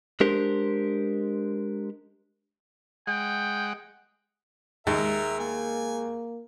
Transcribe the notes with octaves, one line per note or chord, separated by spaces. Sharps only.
G#3 D4 G4 A#4 C5
G#3 F#5 G5
D#2 G#3 A#4 E5
A#3 G#5